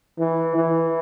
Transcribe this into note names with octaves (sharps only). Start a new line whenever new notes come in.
E3
E3